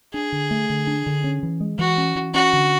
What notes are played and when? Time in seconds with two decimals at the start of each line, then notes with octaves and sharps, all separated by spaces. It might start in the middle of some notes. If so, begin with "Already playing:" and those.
0.14 D4 G#4
0.32 D3
0.51 A3
0.70 D3
0.87 D4
1.06 D3
1.24 C#4
1.43 E3
1.61 G#3
1.79 E3 F#4
1.98 C#4
2.15 E3
2.34 C#4 F#4
2.53 D3